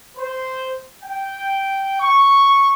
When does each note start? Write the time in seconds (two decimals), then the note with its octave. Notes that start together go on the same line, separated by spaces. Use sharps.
0.17 C5
1.02 G5
2.01 C#6